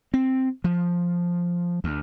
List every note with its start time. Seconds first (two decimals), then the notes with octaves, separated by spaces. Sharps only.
0.14 C4
0.64 F3
1.84 D2